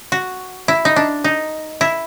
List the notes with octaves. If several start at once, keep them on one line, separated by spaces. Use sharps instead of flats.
F#4
E4
D#4
D4
D#4
E4